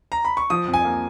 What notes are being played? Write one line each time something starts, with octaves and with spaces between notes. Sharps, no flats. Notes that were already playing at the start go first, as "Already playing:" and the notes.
A#5
B5
C#6
F3 D#6
F2
G#5
A#3